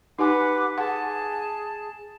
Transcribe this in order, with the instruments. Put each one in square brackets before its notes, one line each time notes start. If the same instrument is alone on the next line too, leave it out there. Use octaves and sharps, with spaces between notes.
[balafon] D#4 G4 G#5 [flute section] B4 F#5 D6
[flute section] G#4 A5 [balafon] F#5